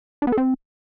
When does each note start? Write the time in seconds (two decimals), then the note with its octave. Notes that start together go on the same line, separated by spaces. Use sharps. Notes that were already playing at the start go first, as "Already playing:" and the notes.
0.22 D4
0.27 B3
0.32 A4
0.37 C4